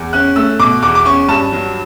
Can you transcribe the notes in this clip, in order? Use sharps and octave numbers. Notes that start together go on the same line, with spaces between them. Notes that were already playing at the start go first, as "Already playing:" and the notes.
Already playing: E2
C#4 F#6
A3 E6
B2 D6
E2 D6
D6
C#4 C#6
G2 A5
F#3